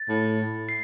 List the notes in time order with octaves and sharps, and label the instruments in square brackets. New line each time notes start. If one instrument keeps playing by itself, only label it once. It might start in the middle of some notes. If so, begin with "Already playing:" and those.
Already playing: [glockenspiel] A6
[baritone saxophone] A2
[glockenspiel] C7